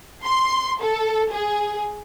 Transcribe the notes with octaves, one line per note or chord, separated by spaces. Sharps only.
C6
A4
G#4